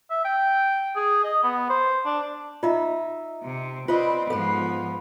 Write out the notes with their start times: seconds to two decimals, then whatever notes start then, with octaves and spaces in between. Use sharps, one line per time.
0.10 E5
0.25 G5
0.96 G#4
1.24 D#5
1.43 B3
1.70 C5
2.05 D4
2.63 D#4 F4 D#5 E5
3.43 C3
3.88 C4 F4 B4 D5 D#5
4.30 G#2 F3 B3 A4 B4